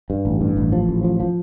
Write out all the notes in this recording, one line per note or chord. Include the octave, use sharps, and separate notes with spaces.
G2
A1
G2
A1
F3
A1
F3
F3